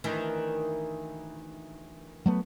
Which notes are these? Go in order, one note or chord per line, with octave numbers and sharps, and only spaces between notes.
D2 D#3 E3
F#3 A3 B3